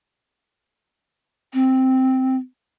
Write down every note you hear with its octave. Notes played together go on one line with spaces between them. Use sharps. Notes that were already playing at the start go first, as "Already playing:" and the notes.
C4